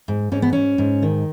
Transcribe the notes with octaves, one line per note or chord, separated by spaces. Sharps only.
G#2
G#2 C#4
B3
G#2 C#4
G#2
D#3